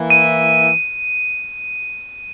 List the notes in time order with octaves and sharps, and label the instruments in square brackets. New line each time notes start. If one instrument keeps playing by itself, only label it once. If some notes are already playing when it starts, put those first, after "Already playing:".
Already playing: [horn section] E3 A#3 E4
[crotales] D#7